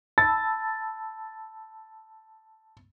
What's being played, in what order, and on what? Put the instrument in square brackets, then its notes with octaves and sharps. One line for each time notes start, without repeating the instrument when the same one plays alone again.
[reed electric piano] A5 B5 E6 [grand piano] A6